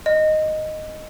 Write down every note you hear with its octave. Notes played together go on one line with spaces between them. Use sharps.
D#5